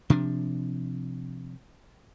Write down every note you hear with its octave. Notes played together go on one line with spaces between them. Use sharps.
C3 F3 D4